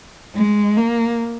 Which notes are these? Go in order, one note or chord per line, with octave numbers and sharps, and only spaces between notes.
G#3
A#3